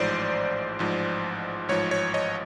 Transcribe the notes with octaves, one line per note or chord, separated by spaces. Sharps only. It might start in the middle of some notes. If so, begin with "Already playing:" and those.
Already playing: A1 G#2 F3 C5 D5
A1 G#2 F3
A1 G#2 F3 C#5
C#5
C#5 D#5